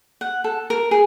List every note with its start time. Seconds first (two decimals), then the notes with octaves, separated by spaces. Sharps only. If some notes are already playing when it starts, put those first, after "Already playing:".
0.21 F#5
0.44 A4
0.70 A#4
0.91 G#4